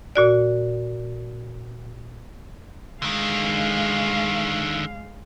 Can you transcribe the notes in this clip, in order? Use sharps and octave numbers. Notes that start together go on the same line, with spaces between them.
A#2 F#4 D5
D3 D#3 G#3 F5